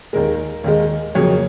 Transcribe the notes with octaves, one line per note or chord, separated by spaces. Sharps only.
D#2 D#3 G#3 A#4
D#2 D#3 G#3
F2 C#3 F#3 A#3 C#5